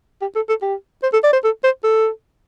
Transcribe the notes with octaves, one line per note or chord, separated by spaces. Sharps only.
G4
A4
A4
G4
C5
A4
D5
C5
A4
C5
A4